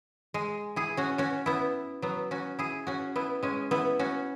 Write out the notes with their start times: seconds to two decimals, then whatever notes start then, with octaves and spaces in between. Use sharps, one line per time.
0.34 G#3
0.76 E4 G#4
0.97 C#4 F#4
1.18 C#4 F#4
1.46 B3 E4
2.02 F#3 B3
2.31 C#4 F#4
2.59 E4 G#4
2.87 C#4 F#4
3.16 B3 E4
3.43 G#3 C#4
3.71 B3 E4
3.99 C#4 F#4